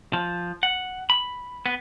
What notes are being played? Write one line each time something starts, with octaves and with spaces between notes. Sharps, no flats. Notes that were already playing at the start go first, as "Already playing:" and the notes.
F3
F#5
B5
B3